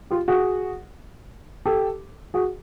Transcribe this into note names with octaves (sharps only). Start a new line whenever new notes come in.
F4 G4
F#4 G#4
G4 A4
F#4 G#4